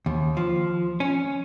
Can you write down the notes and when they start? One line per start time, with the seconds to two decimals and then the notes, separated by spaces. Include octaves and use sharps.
0.06 D#2
0.37 F3
1.00 C#4